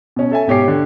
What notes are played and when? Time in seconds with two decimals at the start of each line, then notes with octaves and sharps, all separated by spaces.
0.16 B2 C#4
0.31 A4 E5 G#5
0.47 G#2 B2 G4 C#5 D6 C7
0.68 D3